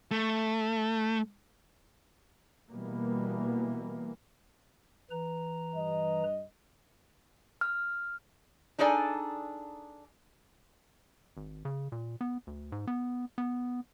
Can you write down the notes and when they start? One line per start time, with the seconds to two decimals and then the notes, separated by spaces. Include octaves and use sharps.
0.11 A3
2.70 B2 E3 G3 A#3 B3
5.11 E3 B4 A#5
5.74 G2 D#5
7.61 F6
8.78 D4 D#4 G#4 A4 D5 G#5
11.37 G#1
11.65 C#3
11.92 A#2
12.21 B3
12.47 D2
12.72 G#2
12.87 B3
13.38 B3